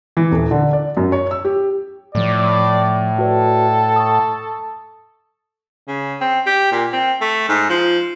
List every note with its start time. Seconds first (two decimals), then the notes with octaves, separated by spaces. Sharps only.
0.17 E3
0.31 D#1
0.51 D3
0.73 D5
0.97 F#2
1.12 C#5
1.31 E6
1.45 G4
2.15 A2 F3 A3 D5
3.19 F#4 A4 B4 D5
3.96 C#6 D#6
5.88 C#3
6.21 C4
6.46 G4
6.72 A#2
6.92 C4
7.21 A3
7.48 G#2
7.70 F3